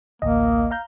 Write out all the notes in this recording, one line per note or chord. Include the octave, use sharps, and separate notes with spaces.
A1 D2 A#3 D#5
F5 A#5 G6